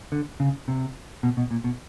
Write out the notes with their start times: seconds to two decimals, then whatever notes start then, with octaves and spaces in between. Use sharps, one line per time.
0.12 D3
0.40 C#3
0.68 C3
1.23 B2
1.37 B2
1.51 A#2
1.64 B2